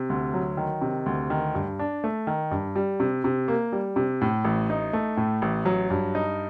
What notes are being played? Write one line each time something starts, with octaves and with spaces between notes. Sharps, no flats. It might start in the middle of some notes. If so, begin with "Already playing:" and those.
Already playing: C3
D2
F#3
D#3
C3
D2
D#3
G2
D4
A3
D#3
G2
G3
C3
C3
A#3
G3
C3
A2
A1
D#4
A3
A2
A1
F#3
G2
D#4